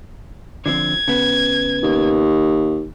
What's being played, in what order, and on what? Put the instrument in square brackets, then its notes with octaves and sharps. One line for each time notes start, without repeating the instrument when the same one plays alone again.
[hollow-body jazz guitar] D3 F3 C4 [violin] G#6
[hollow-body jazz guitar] C#3 B3
[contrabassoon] D#2